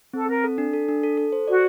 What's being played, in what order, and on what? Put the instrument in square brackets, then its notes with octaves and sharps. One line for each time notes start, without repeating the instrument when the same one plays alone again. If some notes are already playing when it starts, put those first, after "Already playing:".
[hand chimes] C4 [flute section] A4
[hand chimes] C4 [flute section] A#4
[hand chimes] A4
D4
A4
D4
A4
A4
C5
[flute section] F#4 [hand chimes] D5